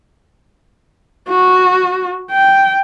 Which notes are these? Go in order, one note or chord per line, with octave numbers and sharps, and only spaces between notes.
F#4
G5